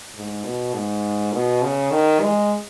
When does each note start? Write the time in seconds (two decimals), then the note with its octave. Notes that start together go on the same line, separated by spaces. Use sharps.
0.15 G#2
0.44 B2
0.74 G#2
1.32 B2
1.62 C#3
1.91 D#3
2.21 G#3